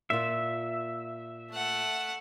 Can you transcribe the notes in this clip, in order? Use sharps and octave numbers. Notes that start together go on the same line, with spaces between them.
A#2 F4 E5
A3 F#5